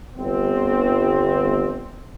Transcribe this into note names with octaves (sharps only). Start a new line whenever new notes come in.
G1 C4